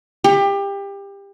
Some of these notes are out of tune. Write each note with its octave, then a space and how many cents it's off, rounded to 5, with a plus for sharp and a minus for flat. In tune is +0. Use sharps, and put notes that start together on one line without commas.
G4 +25